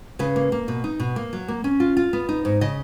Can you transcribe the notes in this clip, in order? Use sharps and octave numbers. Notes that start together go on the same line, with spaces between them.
C#3 B4
A#3
A#3
B2
D#4
B2
A#3
F#3
A#3
C#4
F4
F4
B3
D#4
G#2
C#3 D#5